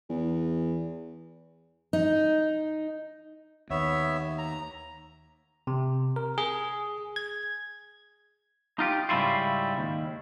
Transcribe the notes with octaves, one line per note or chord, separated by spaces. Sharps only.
E2
D#4
D#2 B3 C#5 E5
A#5
C3
A#4
G#4
G#6
D#4 F4 G4
G#2 C#3 G3 E4 F4
D#2